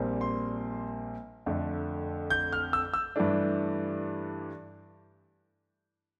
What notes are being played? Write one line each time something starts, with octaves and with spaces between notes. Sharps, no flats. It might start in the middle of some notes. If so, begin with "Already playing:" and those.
Already playing: A#1 A#2 G3 C4
C6
F2 D3 A3
G6
F6
E6
E6
G2 E3 A3 D4